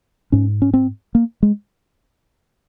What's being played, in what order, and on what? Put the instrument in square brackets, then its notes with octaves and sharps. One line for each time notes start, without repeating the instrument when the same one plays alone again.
[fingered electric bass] G#2 C#4
C#4
C4
A#3
G#3